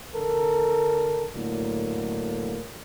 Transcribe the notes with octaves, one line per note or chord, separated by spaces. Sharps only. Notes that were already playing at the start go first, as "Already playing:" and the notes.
D3 A4 A#4
A2 D3 F#3 A#3